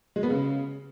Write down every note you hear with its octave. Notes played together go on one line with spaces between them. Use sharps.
G#3
B3
C#3